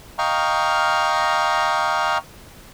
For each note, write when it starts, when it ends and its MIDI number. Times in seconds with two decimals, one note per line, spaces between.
0.19 2.18 75
0.19 2.18 77
0.19 2.18 79
0.19 2.18 82
0.19 2.18 85
0.19 2.18 89